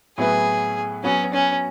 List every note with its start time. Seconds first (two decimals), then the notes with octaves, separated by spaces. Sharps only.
0.18 A2 F#3 B3 E4 G#4 B4
1.04 F#3 B3 C#4 F#4 B4
1.33 C#4